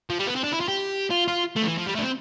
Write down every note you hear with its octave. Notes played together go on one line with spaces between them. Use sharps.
F3
G3
B3
C4
D4
E4
F4
G4
F4
F4
A3
F3
E3
F3
G3
A3
D4
C4